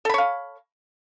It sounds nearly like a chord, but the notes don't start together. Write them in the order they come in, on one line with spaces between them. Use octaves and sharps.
A4 B5 C#5 F5